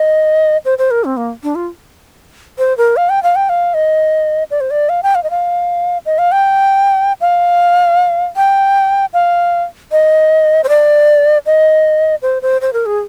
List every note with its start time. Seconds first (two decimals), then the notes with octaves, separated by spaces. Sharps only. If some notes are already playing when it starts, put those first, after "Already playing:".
Already playing: D#5
0.65 C5
0.78 C5
0.91 A#4
1.04 C4
1.17 A#3
1.43 D4
1.55 F4
2.58 C5
2.77 A#4
2.97 F5
3.09 G5
3.23 F5
3.36 G5
3.49 F5
3.74 D#5
4.51 D5
4.60 C5
4.70 D5
4.89 F5
5.03 G5
5.15 F5
5.23 D#5
5.30 F5
6.06 D#5
6.18 F5
6.32 G5
7.21 F5
8.36 G5
9.13 F5
9.92 D#5
10.64 C5
10.69 D5
11.46 D#5
12.22 C5
12.42 C5
12.61 C5
12.73 A#4
12.86 G#4